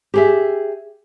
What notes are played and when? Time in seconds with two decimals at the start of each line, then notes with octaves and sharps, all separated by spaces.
0.14 G4 G#4 E5